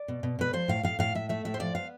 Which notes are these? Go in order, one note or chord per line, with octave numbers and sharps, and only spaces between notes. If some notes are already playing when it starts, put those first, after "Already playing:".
Already playing: D5
B2
B2
B2 B4
F3 C5
A2 F5
A2 F5
A2 F5
A2 E5
A3 E5
A2 E5
C5
F3 D5
B3 F5